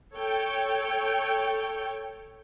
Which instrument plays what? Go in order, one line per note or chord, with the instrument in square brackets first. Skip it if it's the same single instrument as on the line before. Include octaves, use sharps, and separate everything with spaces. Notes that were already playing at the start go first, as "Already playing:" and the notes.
[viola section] A4 C#5 G5